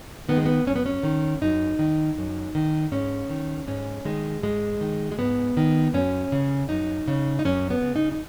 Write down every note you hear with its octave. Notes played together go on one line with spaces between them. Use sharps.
D#3 B3
G#3
B3
F#2 C#4
B3
C#4
D#3
F#2 D#4
D#3
F#2
D#3
G#2 C#4
D#3
G#2 C#4
D#3 G#3
G#2 G#3
D#3
G#3
G#2 B3
D#3
F#2 C#4
C#3
F#2 D#4
C#3
D#4
F#2 C#4
B3
C#3
D#4
D#4